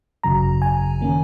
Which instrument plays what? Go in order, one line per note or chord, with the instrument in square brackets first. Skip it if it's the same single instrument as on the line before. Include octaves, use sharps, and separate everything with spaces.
[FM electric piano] G#1 F#2 C#3 F#3 A#5
G#5
D#3 A#3 C#4